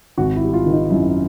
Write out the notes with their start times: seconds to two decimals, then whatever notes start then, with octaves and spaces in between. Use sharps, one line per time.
0.18 G#1 F#4
0.36 E4
0.43 G3
0.54 F4
0.66 D#3
0.73 D#4
0.90 F#2 E4